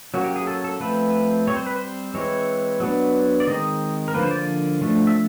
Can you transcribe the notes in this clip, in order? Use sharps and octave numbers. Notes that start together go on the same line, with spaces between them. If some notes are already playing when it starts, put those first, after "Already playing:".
F#3 A#3 C#4 F#4
G4
G#4
A4
A4
F3 A3 C4 B4
G3 C4 C#5
C5
B4
C5
E3 G#3 C4 C#5
F#3 B3 D4
D5
D#3 G#3 C4 D#5
A#4
D3 F3 A#3 B4
C5
D5
F3 A3 D4
E5